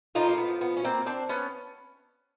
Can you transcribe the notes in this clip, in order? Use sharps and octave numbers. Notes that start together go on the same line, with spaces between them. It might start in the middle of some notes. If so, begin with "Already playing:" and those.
A2 F3 A#3 D#4 F4
A#3
B3
B3
C#4
A#3 C4
C4 D4
B3 C#4